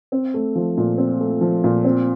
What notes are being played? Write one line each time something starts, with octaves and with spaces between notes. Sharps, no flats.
C4
A3
F3
A#2
C4
A3
F3
A#2
C4